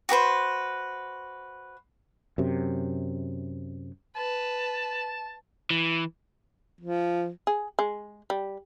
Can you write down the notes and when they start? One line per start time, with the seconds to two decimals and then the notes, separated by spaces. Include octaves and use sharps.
0.09 F#4 G4 B4 C5
2.38 F#2 C3
4.16 B4 A5
5.70 E3
6.81 F3
7.47 G#4
7.79 G#3
8.30 G3